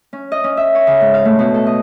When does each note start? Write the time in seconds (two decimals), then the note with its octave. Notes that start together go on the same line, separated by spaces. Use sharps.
0.13 C#4
0.32 D#5
0.44 C#4
0.57 E5
0.75 C#5
0.87 C#3
1.01 G#2
1.14 F5
1.25 A3
1.39 B2
1.54 A4
1.66 D#5